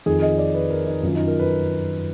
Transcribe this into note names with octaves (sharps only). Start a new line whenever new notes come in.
F2 D#3 G#4
D#5
D5
B4
A#4
D#4
F#2 D#3 F4
D#4
A#4
B4